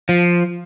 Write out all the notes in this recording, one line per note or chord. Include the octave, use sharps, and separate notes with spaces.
F3